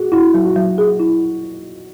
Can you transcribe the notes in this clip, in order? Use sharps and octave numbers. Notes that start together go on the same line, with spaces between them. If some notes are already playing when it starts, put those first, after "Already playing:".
Already playing: F#4 G#4
E4 F#4
F#3
F#4
F#3
G#4
E4